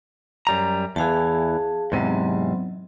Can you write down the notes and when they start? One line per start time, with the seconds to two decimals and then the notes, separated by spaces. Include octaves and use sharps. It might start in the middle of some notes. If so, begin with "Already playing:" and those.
0.47 F#2 G3 A#5
0.96 E2 E3 G#4 F5 A5
1.92 E2 G#2 C3 F#3 B3 C4